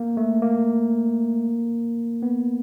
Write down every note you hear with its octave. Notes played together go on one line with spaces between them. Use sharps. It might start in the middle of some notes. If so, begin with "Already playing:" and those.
Already playing: A#3
A3
A#3
B3